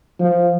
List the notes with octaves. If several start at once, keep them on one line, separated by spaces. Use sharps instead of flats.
F3